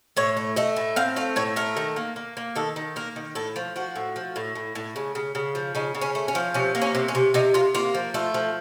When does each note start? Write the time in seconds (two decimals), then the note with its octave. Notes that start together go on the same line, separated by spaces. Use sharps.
0.17 A2 C#5
0.37 A3
0.56 A3 D#5
0.76 A2
0.96 C4 F5
1.16 A3 F5
1.36 A2 C#5
1.56 A3 A#4
1.77 D#3
1.96 A#3
2.16 A#3
2.37 A#3
2.55 D#3 A4
2.76 D#3
2.96 A#3 A#4
3.16 D#3
3.35 A2 A4
3.56 F3
3.76 F3 F#4
3.96 A2
4.16 F3
4.36 A2
4.55 A2
4.75 A2
4.96 C#3
5.15 C#3
5.35 C#3
5.55 F3
5.75 C#3 D#4
5.95 C#3
6.02 C#4
6.15 A3
6.28 C#4
6.35 F3
6.54 C3 C#4
6.75 A#3
6.82 C#4
6.95 C3
7.08 C#4
7.15 C3
7.34 C3 D#4
7.54 C3 F4
7.75 A#3 F4
7.95 F3
8.14 A3 F4
8.34 F3